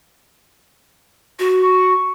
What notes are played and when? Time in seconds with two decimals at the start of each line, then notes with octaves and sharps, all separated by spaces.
1.39 F#4
1.61 C#6